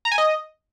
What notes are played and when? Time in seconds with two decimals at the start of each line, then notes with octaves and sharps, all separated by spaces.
0.05 A#5
0.12 G#5
0.18 D#5